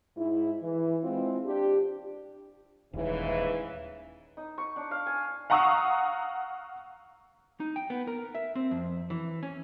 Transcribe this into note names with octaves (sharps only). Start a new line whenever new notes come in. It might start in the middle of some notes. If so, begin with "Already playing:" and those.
G#2 E4
E3
G#3 C4 E4 F4
D4 G4
D#1 G#2 C#3 E3
D#4
C#6
D4
F5
G#5
F5 F#5 A#5 C#6 D#6 E6
D#4
G5
B3
A#4
E5
C4
F2
E3
C#4